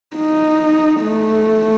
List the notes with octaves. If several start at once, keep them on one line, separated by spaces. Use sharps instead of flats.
D#4
A3